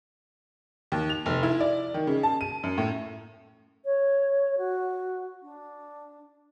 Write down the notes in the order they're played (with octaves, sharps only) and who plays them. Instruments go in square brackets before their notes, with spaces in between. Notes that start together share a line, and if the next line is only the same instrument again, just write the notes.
[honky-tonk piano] D#2
F7
F1
E4
D5
D#3
C#3
A5
D#7
F#2
A2
[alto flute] C#5
F#4
D4